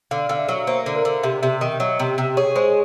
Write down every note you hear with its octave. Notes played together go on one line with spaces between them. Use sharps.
D3 F5
D3 F5
E5
F#3
A#3 C5
D3
A#4
D3
C3 E5
C3 E5
D#3 D#5
F#3
C3
C3
G#4 C#5
G#3 C5